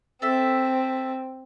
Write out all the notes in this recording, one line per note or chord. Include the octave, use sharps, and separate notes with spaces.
C4 A4 E5